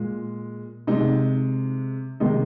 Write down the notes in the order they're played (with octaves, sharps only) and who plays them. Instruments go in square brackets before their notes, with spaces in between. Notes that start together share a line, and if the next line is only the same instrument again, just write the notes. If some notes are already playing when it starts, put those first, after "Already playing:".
Already playing: [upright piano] A#2 G#3
C3 G#3 D#4
C3 D#3 G#3 D#4